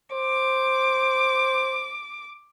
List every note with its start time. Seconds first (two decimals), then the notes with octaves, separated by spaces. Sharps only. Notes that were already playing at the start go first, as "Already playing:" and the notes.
0.12 C5 D6